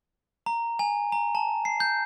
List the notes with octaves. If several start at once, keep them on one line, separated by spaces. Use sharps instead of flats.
A#5
G#5
A#5
A5
C7
G6